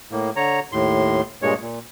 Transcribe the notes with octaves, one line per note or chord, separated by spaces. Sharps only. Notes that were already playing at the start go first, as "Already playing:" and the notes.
A2 A#3
D3 C#5 A#5
D#2 A2 C6
G2 A#2 G#3 C#5
A#2